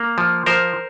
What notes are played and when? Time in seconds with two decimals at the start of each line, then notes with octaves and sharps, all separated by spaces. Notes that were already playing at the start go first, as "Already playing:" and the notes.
Already playing: A#3
0.18 F3
0.46 F3 A#4 C5